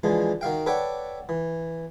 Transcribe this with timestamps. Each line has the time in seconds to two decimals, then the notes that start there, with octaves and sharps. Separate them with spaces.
0.03 D3 E3 F3 G#3
0.41 D#3 F#4 F5 G5
0.66 A4 B4 C#5 D5 F#5 G5
1.29 E3